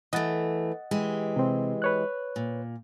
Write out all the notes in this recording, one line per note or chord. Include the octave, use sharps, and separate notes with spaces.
E3 A3 D#5 F#5 A6
E3 G#3 G4
C3 C4
B4 C#5 F#6
A#2